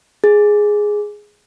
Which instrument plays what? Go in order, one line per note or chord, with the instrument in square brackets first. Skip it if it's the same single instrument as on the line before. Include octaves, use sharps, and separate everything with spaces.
[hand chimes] G#4